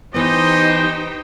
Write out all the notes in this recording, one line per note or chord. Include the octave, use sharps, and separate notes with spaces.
E3 B3 D#4 G4 C5 D#5 G5